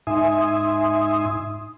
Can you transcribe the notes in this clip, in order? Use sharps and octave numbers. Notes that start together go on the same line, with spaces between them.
G#2 D#4 E5 G#5 C6 D#6